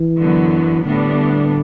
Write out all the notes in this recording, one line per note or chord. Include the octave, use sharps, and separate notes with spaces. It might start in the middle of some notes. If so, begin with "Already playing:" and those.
Already playing: E3
F#2 D3 F#3 B3
A2 D3 G3 B3 D4